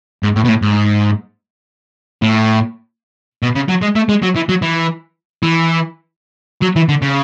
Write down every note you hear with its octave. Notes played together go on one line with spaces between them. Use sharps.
G#2
A2
B2
A2
G#2
A2
B2
C#3
F#3
G#3
A3
G#3
F#3
E3
F#3
E3
E3
F#3
E3
D3
C#3